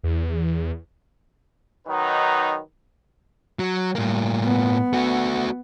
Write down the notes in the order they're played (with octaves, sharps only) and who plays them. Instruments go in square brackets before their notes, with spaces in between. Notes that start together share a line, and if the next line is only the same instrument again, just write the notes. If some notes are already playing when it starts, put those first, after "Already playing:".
[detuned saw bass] E2
[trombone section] D#3 F#3 D#4 B4
[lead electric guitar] F#3
[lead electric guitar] A2 A#3 [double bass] G3
[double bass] B3
[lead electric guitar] A3 F#4